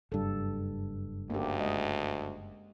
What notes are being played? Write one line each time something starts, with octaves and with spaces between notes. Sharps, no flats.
F#1 G2 A4
D2 A#3 C#4 G4
G#3 D#5